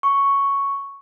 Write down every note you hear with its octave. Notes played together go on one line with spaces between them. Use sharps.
C#6